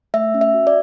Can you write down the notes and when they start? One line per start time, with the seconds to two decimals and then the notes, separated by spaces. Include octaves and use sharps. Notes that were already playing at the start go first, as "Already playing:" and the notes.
0.14 A3 E5
0.34 C#4
0.41 E5
0.54 F#4
0.67 D5